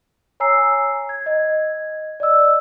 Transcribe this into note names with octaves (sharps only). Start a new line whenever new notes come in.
C#5 G#5 A#5 E6 C7
G#6
D#5 G#6
D5 D#5 E6